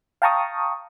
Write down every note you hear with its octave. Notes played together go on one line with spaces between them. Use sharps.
F5 G5 A5 A#5 C#6 D#6